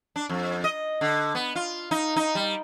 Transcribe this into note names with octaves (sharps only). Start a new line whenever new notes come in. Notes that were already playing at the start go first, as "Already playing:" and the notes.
D4
F2
D#5
D3
B3
F4
D#4
D#4
G3